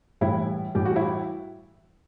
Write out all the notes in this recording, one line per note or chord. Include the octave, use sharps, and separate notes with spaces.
A2 E3 G3 E4
A2 E3 G3 G4
F#4
E4